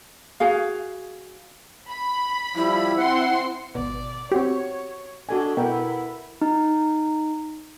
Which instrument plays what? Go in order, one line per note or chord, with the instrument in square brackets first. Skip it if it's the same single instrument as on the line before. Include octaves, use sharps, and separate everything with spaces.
[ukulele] F#4 G#4 F5
[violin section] B5
[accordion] F3 G3 [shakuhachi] E4
[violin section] C4 C6 [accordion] F#5
[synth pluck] G#1 B2 [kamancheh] D5
[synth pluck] C4 G4 [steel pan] F#4 [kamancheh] C#5
[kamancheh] D4 D#5 [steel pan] F#4 A4 G#5
[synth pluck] B2 [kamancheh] B3 E4 [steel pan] A#4 G5
[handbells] D#4